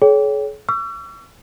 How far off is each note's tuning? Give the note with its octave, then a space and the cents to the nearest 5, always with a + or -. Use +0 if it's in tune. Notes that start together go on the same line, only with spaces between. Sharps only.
G#4 +45 C#5 +20 G5 +0
C#6 +40 E6 +45